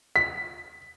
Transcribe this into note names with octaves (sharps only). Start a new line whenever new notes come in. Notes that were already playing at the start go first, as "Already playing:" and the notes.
B6